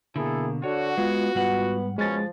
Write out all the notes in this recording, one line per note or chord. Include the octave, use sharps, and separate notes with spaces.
B2 D3 A#3 E4 G#4 A4
D3 F#4 C#5
G#3 B3 F4
G#2 G3 B3 F#5
B2 F3 G#3 C#4 A6